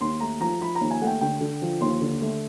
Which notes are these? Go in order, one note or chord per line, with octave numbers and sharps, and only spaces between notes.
D#2 C6
A3 A#5
F3 A#5
F3 B5
A#5
D#2
G#5
A3 F#5
G5
D3 G5
D3
F3
D#2 C6
D3
A3